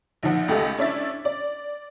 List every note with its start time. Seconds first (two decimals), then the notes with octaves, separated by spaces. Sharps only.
0.23 A#1 D#3 F3 F#5
0.48 C#2 A3 G4 A4 D#5
0.78 C#4 D4 E4 E5 A6
1.25 D5